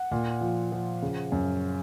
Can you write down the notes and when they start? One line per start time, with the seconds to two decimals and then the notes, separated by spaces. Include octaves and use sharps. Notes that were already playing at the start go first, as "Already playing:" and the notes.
Already playing: F#5
0.11 A#2
0.41 F3
0.72 F3
1.02 C#3
1.32 F#2